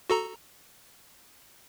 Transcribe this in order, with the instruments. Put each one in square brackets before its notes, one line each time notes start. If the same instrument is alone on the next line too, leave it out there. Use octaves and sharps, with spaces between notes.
[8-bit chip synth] F#4 A4 A#5